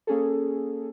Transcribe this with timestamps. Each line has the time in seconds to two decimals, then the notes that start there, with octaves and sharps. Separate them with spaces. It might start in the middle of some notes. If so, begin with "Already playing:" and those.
0.07 A#3 C#4 G#4 A4